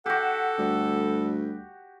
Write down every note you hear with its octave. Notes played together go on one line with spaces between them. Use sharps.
F#4 G4 A4 F#5
D2 G3